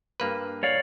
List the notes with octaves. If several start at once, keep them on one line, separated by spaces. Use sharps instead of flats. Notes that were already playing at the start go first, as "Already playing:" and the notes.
G2 A#3 B4
C#5 D5 F5